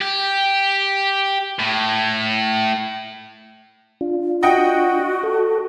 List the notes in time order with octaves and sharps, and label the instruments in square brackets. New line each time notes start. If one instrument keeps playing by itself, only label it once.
[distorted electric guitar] G4
A2
[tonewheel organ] D4 F4
[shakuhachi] F#4 [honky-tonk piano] D#5 F#5 G5
[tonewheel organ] A4